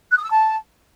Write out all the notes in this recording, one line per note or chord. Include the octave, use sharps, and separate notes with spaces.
F#6
D#6
E6
A5